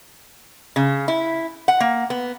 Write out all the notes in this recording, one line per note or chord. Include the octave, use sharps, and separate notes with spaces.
C#3
E4
F#5
A#3
B3